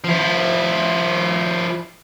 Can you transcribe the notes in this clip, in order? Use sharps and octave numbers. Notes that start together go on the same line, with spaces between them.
F3 E4